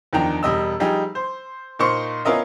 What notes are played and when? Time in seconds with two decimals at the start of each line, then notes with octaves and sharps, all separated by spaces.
0.13 E2 D#3 F3 D4 G5 A#5
0.43 E1 G3 D#5 E6
0.80 F3 G3 D#4 G4 G#4
1.15 C5
1.79 A#2 D#4 C5 C#6 C#7
2.25 B3 C#4 F4 A#4 D#5 E5